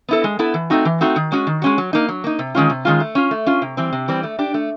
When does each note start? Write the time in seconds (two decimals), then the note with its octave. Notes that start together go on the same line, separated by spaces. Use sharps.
0.09 B3 E4 A4
0.24 G#3
0.39 B3 E4 A4
0.54 E3
0.70 A3 C4 D#4 F#4
0.85 E3
1.01 A3 C4 D#4 F#4
1.16 D#3
1.32 G#3 C#4 F#4
1.47 D#3
1.62 G#3 C#4 F#4
1.78 F#3
1.93 A#3 D#4
2.09 F#3
2.24 A#3 D#4
2.39 C3
2.55 D#3 G#3 C#4 F4
2.70 C3
2.85 D#3 G#3 C#4 F4
3.00 A3
3.15 C#4 F4
3.31 A3
3.46 C#4 F4
3.62 C3
3.77 E3 G3 C4
3.93 C3
4.08 E3 G3 C4
4.23 A3
4.39 D4 G4
4.54 A3